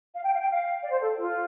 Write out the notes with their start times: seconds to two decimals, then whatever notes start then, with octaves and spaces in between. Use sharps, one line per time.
0.15 F5
0.24 G5
0.33 F5
0.40 G5
0.49 F5
0.83 D5
0.91 C5
1.00 A4
1.17 F4